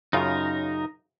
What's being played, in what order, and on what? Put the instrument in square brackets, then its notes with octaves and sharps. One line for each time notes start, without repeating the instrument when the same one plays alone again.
[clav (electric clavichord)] F#2 C#3 F4 [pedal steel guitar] D#4 A#4